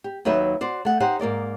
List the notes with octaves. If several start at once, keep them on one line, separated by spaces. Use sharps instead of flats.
G4
D#2 F#3 D#4 B4 E5
F#4 C5 D5
A3 F#5
D#4 G4 C5 F#5
G#2 A#3 D5 D#5